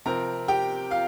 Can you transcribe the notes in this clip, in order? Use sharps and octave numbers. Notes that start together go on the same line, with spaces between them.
C3 F3 C4 A#4 A#5
G4 G5
F4 F5